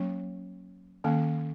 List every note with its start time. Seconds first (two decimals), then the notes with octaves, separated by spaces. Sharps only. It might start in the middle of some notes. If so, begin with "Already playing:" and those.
Already playing: F#3 A#3 C#4
1.04 D#3 A#3 C#4